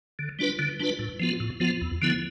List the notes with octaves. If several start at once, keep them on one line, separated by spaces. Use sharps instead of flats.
D3
G3 D4 F4 B4
D3
G3 D4 F4 B4
A2
F3 B3 F4
A2
F3 B3 F4
E2
D3 F3 B3 E4